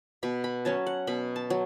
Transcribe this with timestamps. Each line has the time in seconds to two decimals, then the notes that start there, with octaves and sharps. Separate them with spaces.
0.23 B2 B5
0.44 B5
0.65 F#3 C#4 A5
0.87 F#5
1.07 B2 B5
1.36 A5
1.50 F#3